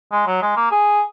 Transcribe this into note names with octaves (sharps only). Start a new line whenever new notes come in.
G#3
F#3
G#3
A#3
G#4